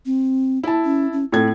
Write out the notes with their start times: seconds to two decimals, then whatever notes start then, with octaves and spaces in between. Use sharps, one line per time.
0.06 C4
0.63 E4 A5
0.85 C#4
1.13 C#4
1.32 A2 C4 A4 G#6